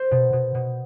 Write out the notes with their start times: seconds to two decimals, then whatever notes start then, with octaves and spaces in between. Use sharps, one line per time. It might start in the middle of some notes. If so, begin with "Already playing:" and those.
Already playing: C5
0.11 B2
0.33 B2
0.55 B2